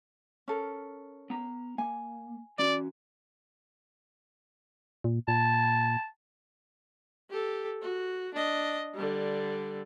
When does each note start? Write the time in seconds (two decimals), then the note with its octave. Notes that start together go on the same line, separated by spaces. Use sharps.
0.48 C#4 A4 A#4
1.30 B3 A#5
1.78 A#3 G#5
2.59 E3 C#4 F#4 D5
5.04 A#2
5.28 A#2 A5
7.30 G4 A4
7.82 F#4
8.34 D4 D#5
8.94 D3 G3